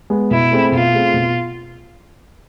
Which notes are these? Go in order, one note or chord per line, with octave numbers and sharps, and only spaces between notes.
G#3 B3
B2 E4
A3 C4 G#4
B2 F4
A3 C4 G#4
B2